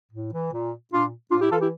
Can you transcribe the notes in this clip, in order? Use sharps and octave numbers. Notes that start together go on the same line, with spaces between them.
A2
E3
A#2
A#2 D4 F4
A2 D4 F4
E4 G4
E3 F4 A4
E4 G4